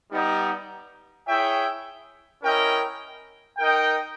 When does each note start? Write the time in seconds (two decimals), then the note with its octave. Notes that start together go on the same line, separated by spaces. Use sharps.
0.11 G3 B3 D#4
1.27 E4 G#4 C#5 E5 G5
2.43 C#4 E4 A#4 D#5 G5
3.58 D#4 A#4 D#5 G5